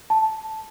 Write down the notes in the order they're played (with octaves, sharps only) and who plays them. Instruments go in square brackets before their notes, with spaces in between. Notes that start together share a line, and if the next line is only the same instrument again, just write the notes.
[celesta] A5